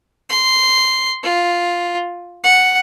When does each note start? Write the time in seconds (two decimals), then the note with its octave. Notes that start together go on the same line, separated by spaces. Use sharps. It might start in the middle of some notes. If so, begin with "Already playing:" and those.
0.30 C6
1.24 F4
2.44 F#5